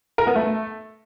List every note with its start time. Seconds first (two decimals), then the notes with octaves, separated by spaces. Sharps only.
0.18 A#4
0.27 B3
0.36 A3